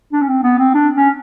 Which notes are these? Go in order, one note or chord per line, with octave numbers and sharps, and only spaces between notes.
D4
C#4
C4
B3
C4
D4
C#4